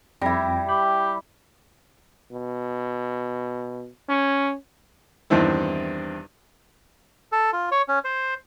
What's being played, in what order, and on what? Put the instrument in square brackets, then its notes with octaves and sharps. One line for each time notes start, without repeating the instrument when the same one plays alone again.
[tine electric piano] F2 G5 A#6 [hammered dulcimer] G3 E4
[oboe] G4 [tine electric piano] B5
[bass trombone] B2
C#4
[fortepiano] E2 G2 D#3 C4 E4
[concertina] A4
F4
C#5
C#4
C5